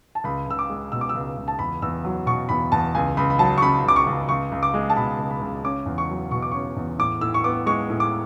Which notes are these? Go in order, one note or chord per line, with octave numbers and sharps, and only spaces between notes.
A5
C#2 B5
C#2 E6
D6
G#3
B2 E6
D6
E6
C#2
C#2
A5
E2 B5
E2 E6
F#3
B2 C#6
E2 B5
E2 A5
C#2 G#5
C#2 B5
B5
F#3 A5
C#6
C#3 B5
C#2 D6
C#6
C#2
C#2 C#6
C#2
D6
G#3
A5
B2 B5
C#2
B5
C#2
C#4 D6
E2
C#6
F#3
B2 C#6
D6
C#4 C#6
E2
A2 D6
A2 E6
C#6
B3 D6
G#3 C#6
A2
D6